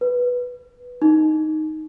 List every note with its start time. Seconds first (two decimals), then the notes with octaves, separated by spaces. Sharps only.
0.01 B4
1.02 D#4